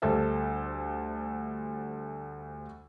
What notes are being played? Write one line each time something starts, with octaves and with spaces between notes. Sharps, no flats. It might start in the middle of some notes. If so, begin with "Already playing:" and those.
D2 G3 A4 C5 E5